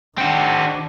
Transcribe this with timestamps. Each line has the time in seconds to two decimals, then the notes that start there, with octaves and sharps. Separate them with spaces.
0.18 D#3 C4 D4 F#4